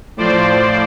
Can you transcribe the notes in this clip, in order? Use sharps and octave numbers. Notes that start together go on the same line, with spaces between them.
A2 F3 C5 D5